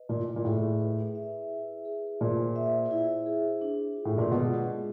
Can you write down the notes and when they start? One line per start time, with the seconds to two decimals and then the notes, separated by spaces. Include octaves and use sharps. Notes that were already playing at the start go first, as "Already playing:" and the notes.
Already playing: B4 D#5
0.09 A#2 E4
0.36 A#2
0.45 A2 G#4
0.80 B4
1.15 E5
1.50 E4
1.85 G#4
2.21 A#2 C5
2.56 E5
2.91 E4
3.26 G#4
3.61 D4
3.96 F4
4.05 A2
4.18 A#2
4.32 B2 G#3
4.67 B3